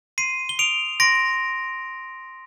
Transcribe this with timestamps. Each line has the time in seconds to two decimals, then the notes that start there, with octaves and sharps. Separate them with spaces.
0.18 C6 C7 D#7
0.49 G7
0.59 D#6 D7 F7
1.00 C6 A#6 D7